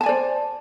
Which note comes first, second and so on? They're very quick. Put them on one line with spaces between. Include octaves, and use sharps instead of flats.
A5 G#5 D5 C5